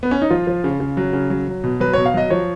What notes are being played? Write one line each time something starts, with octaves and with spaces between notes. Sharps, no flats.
B3
C#4
D#4
F3 F4
F3
C#3
C#3
F#3
C#3
F#3
F#3
B2
F#3 B4
B2 C#5
F5
F#3 D#5
F3 C#5